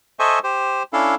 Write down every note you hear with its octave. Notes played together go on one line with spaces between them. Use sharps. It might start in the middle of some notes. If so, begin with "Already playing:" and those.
A4 C5 D#5 E5 G#5 C#6
G4 C5
C#4 D4 E4 A4 F5